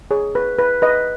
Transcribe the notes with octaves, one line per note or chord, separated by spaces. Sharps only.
G#4 C#5
B4
B4
B4 D#5